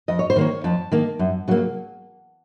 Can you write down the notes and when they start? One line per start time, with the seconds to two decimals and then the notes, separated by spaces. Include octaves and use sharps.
0.08 F2 D#5
0.19 C#5
0.30 C5
0.36 D#3 A#3 C#5
0.64 F2 A5
0.92 D#3 A#3
1.19 F#2
1.48 C#3 F#3 A#3